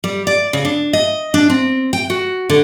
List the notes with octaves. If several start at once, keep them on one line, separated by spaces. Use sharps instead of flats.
G3
D5
C#3
D4
D#5
D4
C4
G5
F#4
D3